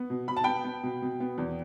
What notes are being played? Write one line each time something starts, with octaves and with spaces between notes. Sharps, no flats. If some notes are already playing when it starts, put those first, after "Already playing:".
Already playing: B3
B2
B2 B5
A5
B3 G5 B5
B3
B2
B2
B3
E2